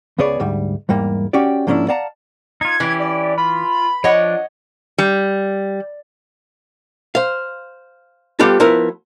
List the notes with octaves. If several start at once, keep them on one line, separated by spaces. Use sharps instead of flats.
C#2 C#3 B3 G#4 C#5 D5
D2 G#2 G3
E2 G#2 G3 A#3
C#4 F#4 G4 D5
G#2 F3 A#3 C#4 D4 E4
D5 F5 F#5 A5 A#5
D#4 F4 G#6
E3 C#4 E4 G4
D5
F4 B5
F3 D4 C#5 D#5 F#5
G3
C5 F5
G3 B3 F4 G4 A4
F3 B3 E4 A#4